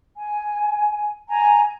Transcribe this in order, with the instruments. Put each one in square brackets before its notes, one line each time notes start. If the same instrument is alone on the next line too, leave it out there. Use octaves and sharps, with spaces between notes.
[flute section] G#5
G#5 A#5